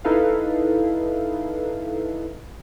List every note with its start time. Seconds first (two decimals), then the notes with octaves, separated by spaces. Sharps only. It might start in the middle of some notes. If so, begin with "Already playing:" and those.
0.04 D#4 E4 A4 B4 F5